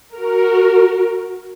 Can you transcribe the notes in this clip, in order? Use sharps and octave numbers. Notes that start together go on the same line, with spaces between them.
F#4 A#4